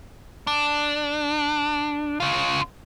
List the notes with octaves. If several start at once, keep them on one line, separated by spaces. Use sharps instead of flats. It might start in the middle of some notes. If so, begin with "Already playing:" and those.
D4
C#3 F4